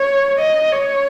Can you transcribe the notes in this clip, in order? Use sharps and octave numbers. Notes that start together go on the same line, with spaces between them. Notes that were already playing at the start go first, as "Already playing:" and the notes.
Already playing: C#5
D#5
C#5